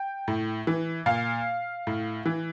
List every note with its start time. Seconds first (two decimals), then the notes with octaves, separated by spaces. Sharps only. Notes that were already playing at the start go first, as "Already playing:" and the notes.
Already playing: G5
0.28 A2
0.67 E3
1.06 A#2 F5
1.87 A2
2.25 E3